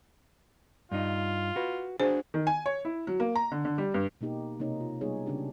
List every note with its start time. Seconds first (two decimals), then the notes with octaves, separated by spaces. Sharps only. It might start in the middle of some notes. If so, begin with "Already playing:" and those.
0.92 G2 D#4 F4
1.56 F#4 B4
2.00 D4 F#4 G#4 C5
2.34 D#3
2.47 G#5
2.66 C#5
2.85 E4
3.07 F#3
3.20 A#3
3.36 A#5
3.52 D3
3.65 D3
3.78 G3
3.94 G2
4.21 B2 A#3 D#4 G4
4.60 C3 A#3 C4 D#4 C#5
4.80 F4
5.01 G3 G#3 B3 D#4 G#4 C#5
5.26 C#3 C#4 D4 G4